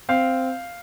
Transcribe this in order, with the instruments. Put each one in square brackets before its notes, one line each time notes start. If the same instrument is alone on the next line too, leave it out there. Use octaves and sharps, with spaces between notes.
[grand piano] C4 F5